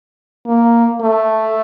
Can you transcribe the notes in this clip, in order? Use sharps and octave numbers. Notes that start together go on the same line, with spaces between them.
A#3
A3